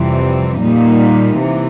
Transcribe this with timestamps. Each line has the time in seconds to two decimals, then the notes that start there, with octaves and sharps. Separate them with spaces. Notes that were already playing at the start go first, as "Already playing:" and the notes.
Already playing: F2 C3 E3 G3 C4
0.60 A#2 G3 A#3 D#4
1.37 C3 E3